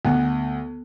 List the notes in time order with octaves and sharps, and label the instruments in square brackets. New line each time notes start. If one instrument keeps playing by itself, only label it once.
[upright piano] D2 F#5 [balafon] B3